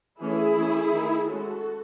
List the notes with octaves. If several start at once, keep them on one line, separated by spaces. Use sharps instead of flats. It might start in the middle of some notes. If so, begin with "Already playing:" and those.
E3 A3 C#4 E4 G#4
E3 A3 C#4
D#3 A3 D#4
G#3 C#4 F#4 A4